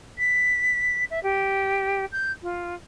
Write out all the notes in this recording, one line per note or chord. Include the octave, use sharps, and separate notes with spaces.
B6
E5
G4
G6
F4